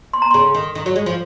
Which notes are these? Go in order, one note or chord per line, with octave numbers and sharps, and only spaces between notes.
C6
A#5
C#3 C6
D#3
D#3
F#3
G#3
F3